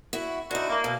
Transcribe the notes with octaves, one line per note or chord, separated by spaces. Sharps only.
E4 F#4
D3 D#4 E4 F#4
A#3
B2